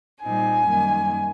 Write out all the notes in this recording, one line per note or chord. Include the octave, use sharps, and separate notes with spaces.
A#2 G3 C4 D#4 G#5
F#2 D#3 G3 A#3